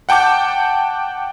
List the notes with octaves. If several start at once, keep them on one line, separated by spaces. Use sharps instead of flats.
F#5 G5 A5 D6 G6